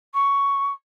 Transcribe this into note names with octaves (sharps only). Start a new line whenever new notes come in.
C#6